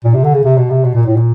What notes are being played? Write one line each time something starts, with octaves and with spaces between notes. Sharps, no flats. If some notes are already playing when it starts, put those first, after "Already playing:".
A#2
C3
D3
C#3
C3
B2
C3
B2
A#2
A2
A#2